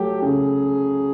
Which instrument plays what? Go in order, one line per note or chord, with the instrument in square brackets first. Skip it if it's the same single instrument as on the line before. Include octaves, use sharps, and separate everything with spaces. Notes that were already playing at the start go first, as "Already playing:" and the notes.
Already playing: [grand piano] F#3 A3 [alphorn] G4
[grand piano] C#3 [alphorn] G#4